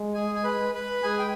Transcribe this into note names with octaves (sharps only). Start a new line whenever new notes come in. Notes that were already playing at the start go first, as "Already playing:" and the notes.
Already playing: G#3
G#4 G#5
G#5
B4 B5
B4 B5
G#3 G#4 G#5
G5